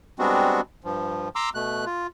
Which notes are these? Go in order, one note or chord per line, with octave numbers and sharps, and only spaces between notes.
G3 G#3 B3 C4 D4 F#4
G2 F3
A#5 C6 D6 E6
B2 A3 F#6
F4